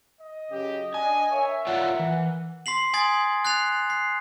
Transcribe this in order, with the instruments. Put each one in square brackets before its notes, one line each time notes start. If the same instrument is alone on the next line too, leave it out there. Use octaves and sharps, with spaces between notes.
[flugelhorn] D#5
[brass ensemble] F#2 C#3 G4
[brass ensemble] D4 [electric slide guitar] G#5
[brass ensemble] A#4 E5 [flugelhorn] C#5
[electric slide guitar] F4 C#5 D5 [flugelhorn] F#5
[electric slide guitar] E3
[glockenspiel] C6 B6 C7 F#7
G#5 C6 D#6 G#6 A6
F#6 A6 C7 F7
C7